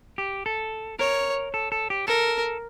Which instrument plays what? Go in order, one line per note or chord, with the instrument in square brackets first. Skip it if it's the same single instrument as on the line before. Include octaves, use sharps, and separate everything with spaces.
[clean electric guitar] G4
A4
[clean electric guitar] A#4 [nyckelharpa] C#5
[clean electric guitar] A4
A4
G4
[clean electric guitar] A4 [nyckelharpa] A#4